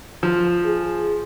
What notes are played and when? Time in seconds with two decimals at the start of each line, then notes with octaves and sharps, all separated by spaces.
0.23 F3
0.65 G#4